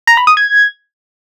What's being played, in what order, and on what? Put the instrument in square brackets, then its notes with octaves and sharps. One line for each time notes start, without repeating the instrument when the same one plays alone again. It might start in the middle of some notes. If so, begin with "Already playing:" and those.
[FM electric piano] A#5
B5
D#6
G#6